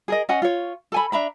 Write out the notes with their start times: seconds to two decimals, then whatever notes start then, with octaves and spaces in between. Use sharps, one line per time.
0.08 G#4 A#4 D#5
0.29 C#4 D#5 F#5 G#5
0.42 F4 C#5
0.92 A4 G#5 B5
1.12 D4 E5 A#5 B5